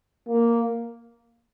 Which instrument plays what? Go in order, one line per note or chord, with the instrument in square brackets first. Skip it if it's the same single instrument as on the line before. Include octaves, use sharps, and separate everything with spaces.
[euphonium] A#3